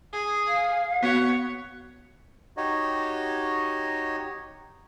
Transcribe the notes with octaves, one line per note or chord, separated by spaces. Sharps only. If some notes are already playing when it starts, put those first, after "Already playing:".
G#4
F5
B3 F#4 C#5
D#4 F#4 G4 C#5 D#5